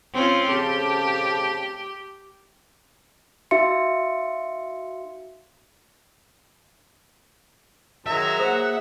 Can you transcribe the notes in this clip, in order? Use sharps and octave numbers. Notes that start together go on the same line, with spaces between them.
C4 C#4 F4
F2 C#3 G4 A5
D#4 F#4 E5 F5 C6 C#7
D#3 F#3 G#3 E5 A#5
A#3 G#4 C5 F#5 D#6